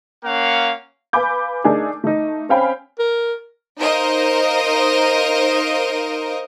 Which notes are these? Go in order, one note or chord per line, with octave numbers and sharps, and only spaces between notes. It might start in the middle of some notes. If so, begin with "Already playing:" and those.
A#3 C#4 F5 F#5
B4 F5 G#5 B5 D6 G6
A3 D4 D#4 G#4 A#4
A3 D#4
C4 C#4 F5 G5 G#5 B5
A#4
D#4 A#4 C5 D#5 F5